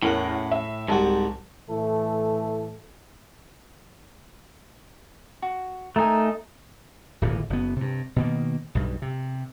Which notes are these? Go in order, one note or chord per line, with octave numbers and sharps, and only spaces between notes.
E2 A2 C#4 A#4 F#5
E5
C2 G#2 F#4 G4 A5
A2 E3 A3 A4
F#4
A3 D#4 A#4 G#5
D1 G#1 A#2 E3
F#1 B3
G2 C3
B2 D#3 A#3
B1 G2
C3